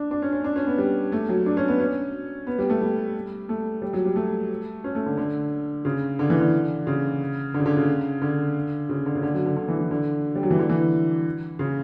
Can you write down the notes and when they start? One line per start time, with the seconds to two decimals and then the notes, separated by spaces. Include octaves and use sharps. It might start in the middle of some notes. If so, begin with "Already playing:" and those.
Already playing: D4
0.11 D4
0.22 C#4
0.32 C#4
0.44 D4
0.56 C#4
0.67 B3
0.78 G3
1.12 A3
1.29 F#3
1.46 D4
1.57 C#4
1.68 B3
1.79 C#4
2.47 B3
2.58 G3
2.70 A3
2.81 G3
3.49 A3
3.82 G3
3.93 F#3
4.05 G3
4.16 A3
4.84 C#4
4.95 A3
5.06 D3
5.17 D3
5.85 C#3
6.19 D3
6.30 E3
6.40 D3
6.87 C#3
7.54 D3
7.60 C#3
7.66 D3
7.77 C#3
8.22 D3
8.89 C#3
9.06 D3
9.15 C#3
9.23 D3
9.34 F#3
9.46 D3
9.56 D3
9.68 E3
9.79 E3
9.91 D3
10.35 G3
10.43 F#3
10.50 E3
10.59 D3
10.69 E3
11.59 C#3